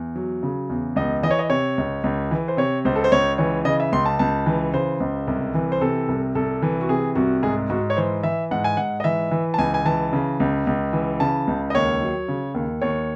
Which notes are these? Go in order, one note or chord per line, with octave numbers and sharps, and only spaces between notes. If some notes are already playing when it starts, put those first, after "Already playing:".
Already playing: E2
F#3
C#3
E2
C#2 D#5
E3 D#5
C#5
D#5
C3 C#5
C#2
C#2
E3
C5
C3 C#5
C#2 C5
A4
C5
C#2 C#5
E3 C#5
C#3 D#5
E5
C#2 C6
A5
C#2 A5
E3
C#3 C5
C#2
C2
E3
C5
C3 A4
C2
C2 A4
E3
F#4
C3 G#4
C2 F#4
G#2 G#4
G#2 F#4
C#5
E3 C5
E3 E5
G#2 F#5
G#5
G#2 F#5
D#5
E3 E5
E3
A5
C#2 G#5
G#5
E3 A5
C#3
C#2
C#2
E3
C#3 A5
C#2
D#5
D#2 C#5
F#3
C#3
D#2
D#2 C#5